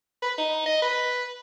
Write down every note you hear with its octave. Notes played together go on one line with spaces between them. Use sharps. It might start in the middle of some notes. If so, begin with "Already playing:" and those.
B4
D#4
D#5
B4